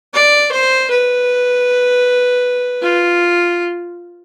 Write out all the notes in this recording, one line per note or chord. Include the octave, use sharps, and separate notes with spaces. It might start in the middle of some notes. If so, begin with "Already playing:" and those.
D5
C5
B4
F4